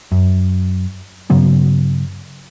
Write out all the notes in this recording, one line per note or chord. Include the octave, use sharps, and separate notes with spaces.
F#2
G2 C#3 F#3 B3